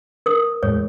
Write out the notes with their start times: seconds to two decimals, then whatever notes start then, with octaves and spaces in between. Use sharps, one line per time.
0.26 A#4 D#6
0.63 E2 A2 G#3 C#5